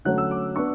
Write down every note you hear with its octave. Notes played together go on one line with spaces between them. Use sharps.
D3 F#3 A3 C#4 F#6
E6
D6
B3 D4 C#6